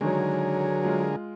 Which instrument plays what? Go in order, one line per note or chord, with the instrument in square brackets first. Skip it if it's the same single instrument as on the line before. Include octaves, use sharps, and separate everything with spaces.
[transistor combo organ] D3 G#4 A#4 [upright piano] D#3 G#3 [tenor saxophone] F#3
[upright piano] G#3 F4